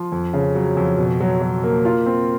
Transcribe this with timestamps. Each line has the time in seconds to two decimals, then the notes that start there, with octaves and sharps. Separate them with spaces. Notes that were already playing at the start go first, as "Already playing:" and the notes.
Already playing: F3
0.12 F2
0.34 C#3
0.55 F#3
0.77 F2
0.98 B2
1.20 F#3
1.42 F#3
1.64 A#3
1.85 F4
2.06 C4